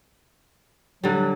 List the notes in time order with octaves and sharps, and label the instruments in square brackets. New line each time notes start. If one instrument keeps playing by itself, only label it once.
[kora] D3 G3 [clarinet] F#3